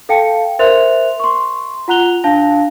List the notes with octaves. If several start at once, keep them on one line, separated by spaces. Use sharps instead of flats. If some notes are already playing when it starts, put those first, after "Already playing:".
A4 F5 G5 A5 C#7
A#4 C5 E5 C6 F#6 F7
C6 C#6
F4 F#5 A#5 F#6 F7 G7
D4 F5 A5 A#6